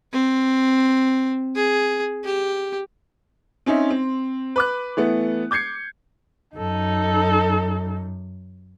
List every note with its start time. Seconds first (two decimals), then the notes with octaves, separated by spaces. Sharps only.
0.13 C4
1.55 G#4
2.24 G4
3.66 C4 C#4 D#4 E5
3.90 C4
4.56 B4 D6 F#6
4.97 E3 A3 B3
5.51 D6 G6 G#6 C7 C#7
6.56 F#2 D#4 A4